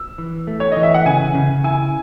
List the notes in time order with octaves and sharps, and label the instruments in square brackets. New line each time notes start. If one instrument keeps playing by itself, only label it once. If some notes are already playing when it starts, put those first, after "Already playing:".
Already playing: [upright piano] E6
[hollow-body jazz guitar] E3
A3
[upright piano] C#5
[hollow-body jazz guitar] E3 [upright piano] D#5
[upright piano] E5
F#5
[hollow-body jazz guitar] C#3 [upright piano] G#5
[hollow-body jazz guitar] C#3
[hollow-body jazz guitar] E4 [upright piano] G#5